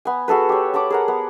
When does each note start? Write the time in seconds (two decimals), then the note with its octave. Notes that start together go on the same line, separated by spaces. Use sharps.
0.05 B3 G#5
0.28 F#4 G#4 A4 B4
0.49 G4 C#5
0.74 A4 F#5 B5 D6
0.90 G#4 A#4 F#5
1.08 B3